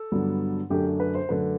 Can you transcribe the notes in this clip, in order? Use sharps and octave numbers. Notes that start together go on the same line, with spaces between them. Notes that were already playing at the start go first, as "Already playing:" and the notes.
Already playing: A4
G2 D3 F#3 B3 D4
F#2 D3 A3 D4 G4
B4
C5
F#2 D3 A3 D4 B4